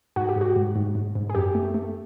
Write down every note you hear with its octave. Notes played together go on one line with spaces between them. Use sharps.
G#2 F#4
G4
G#2
F#4
G#2
G#2
G#2
G#2
G#4
F#2 G4
A3
A3